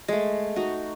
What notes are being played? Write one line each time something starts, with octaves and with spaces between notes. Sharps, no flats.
G#3 A3
D#4 F#4